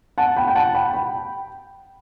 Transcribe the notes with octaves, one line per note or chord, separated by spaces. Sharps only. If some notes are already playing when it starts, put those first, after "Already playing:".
F#5 A5
G5 B5
G5
F#5 A5
G5 B5
G5 B5